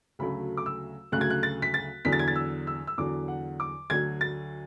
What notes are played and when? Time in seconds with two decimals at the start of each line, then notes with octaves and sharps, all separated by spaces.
0.19 D2 C#3 F#3 A3 B5
0.57 D6
0.66 E6
1.12 D2 C#3 F#3 A3 F#6
1.21 G#6
1.30 F#6
1.43 A6
1.62 B6
1.74 A6
2.05 E2 D3 F#3 B6
2.12 A6
2.19 G#6
2.28 A6
2.36 E6
2.67 E6
2.87 E6
2.98 E2 D3 F#3 D6
3.28 F#5
3.60 D6
3.90 D2 D3 F#3 G#6
4.21 A6